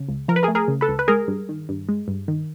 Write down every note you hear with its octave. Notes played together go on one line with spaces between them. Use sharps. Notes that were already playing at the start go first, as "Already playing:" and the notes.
Already playing: C#3
C#2
F3 A#4
B4
G#4 A#4
A3
G#4 A#4
C#3
A4 B4
C#2
B4
G#3 G#4 A#4
G2
D#3
G2
G#3
G2
D#3